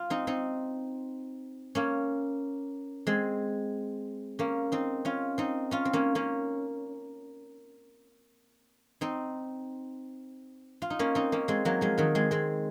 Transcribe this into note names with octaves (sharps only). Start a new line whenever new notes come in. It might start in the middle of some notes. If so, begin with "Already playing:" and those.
Already playing: F4
C4 D#4
C4 D#4
A#3 C#4
G#3 C4
A#3 C#4
C4 D#4
C#4 F4
C4 D#4
C#4 F4
C4
A#3 C#4
A#3 C#4
C4 D#4
F4
D#4
A#3 C#4
C4 D#4
A#3 C#4
G#3 C4
F#3 A#3
F3 G#3
D#3 F#3
G#3 C4
G#3 C4